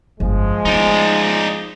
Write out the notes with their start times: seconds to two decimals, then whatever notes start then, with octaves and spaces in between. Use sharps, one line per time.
0.20 G1 F2 F3 G#3
0.65 A3 B3 D#4 D5